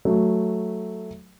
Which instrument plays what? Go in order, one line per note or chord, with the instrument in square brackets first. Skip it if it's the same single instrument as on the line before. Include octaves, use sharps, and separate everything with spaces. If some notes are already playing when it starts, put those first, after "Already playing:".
[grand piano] F#3 A3